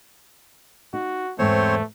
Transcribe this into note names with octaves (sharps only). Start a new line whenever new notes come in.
D#4 F#4
E2 G#2 A3 C4 C5 C#5